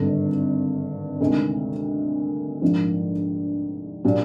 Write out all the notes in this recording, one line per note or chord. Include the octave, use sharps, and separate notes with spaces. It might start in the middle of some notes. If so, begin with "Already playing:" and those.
Already playing: G#1 G2 D3
D2 C3 D#3 G#3
A#1 G#2 F3 A#3
A#2 F#3 A#3 D4 G4